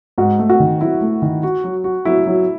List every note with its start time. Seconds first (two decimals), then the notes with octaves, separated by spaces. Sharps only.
0.18 G#2 F#4
0.39 A3
0.50 F#4
0.60 D#3
0.81 F#3 E4
1.01 A3
1.22 D#3
1.43 F#4
1.64 F#3
1.84 F#4
2.05 F#3 E4
2.26 F#3